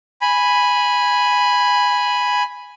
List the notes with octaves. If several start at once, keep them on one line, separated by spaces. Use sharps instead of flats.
G#5 B5